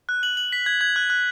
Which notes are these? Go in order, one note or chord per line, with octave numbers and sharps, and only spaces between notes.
F#6
F#7
F#7
B6
G#6
G#6
F#6
F#6